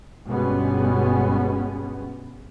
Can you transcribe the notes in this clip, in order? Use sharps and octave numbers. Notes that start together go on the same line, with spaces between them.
G1 B2 G3 G#3 B3 C#4